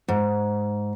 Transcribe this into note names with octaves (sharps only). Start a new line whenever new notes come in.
G#2